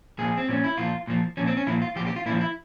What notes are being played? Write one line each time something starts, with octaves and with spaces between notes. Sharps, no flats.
A#2 F3 G#4
C4
A#2 F3 C#4
E4
A#2 F3 F4
A#2 F3
A#2 F3 C#4
C4
C#4
A#2 F3 E4
F4
A#2 F3 G4
G4
F4
A#2 F3 E4
E4